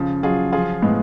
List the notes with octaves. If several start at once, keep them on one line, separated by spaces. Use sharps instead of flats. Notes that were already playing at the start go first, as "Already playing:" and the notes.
Already playing: C#3 F3
F#3 F4 G#4
F3 F4 G#4
A2 G#3 B3